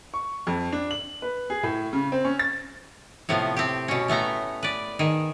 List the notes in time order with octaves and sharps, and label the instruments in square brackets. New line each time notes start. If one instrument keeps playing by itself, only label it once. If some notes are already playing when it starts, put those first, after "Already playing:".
[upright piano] C#6
F2
D4
F#7
B4
G#4
A2
C#3
C4
C#4
A6
[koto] A2 C3 F3 B3
C4 G4
B2 C#4
A2 A3 B3 A#5
B4 D5
D#3 G#4